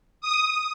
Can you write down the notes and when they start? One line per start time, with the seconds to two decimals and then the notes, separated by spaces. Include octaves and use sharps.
0.21 D#6